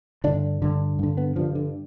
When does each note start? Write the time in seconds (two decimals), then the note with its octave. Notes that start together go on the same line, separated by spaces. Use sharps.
0.24 G2 D3 D4
0.62 G2 D3
0.99 G2 D3
1.17 B3
1.36 G2 D3 F3
1.55 D3